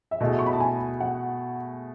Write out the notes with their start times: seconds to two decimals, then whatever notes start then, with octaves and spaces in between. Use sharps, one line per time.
0.11 E5
0.21 B2 A3 E4 G#4 D#5
0.39 C#6
0.46 B5
0.53 A5
0.60 G#5
1.00 F#5